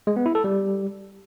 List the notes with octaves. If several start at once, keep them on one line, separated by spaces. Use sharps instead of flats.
G#3
B3
E4
A4
G3